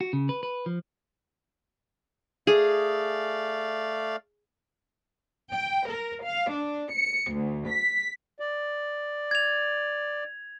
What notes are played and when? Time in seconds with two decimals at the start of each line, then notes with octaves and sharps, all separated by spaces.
0.01 F#4
0.13 C#3
0.29 B4
0.43 B4
0.66 F3
2.47 A3 G#4 D5 F5
5.53 G5
5.87 A#4
6.23 F5
6.53 D4
6.92 C#7
7.34 D2
7.69 B6
8.40 D5
9.31 G#6 F7